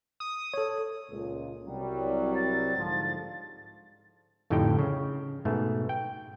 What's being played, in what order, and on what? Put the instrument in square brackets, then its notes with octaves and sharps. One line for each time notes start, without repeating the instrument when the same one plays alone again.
[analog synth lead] D#6
[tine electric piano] A4 C#5
[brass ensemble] C#2 A#2
C2 F#3 G3
[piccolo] A6
[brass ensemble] G#2 D3 F3
[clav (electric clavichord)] F2 A2 D3 D#4 G4 G5
C#3
G#2 B2 A3
G5